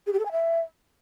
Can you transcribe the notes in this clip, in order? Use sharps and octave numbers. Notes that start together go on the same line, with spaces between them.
G#4
G4
A4
G#5
E5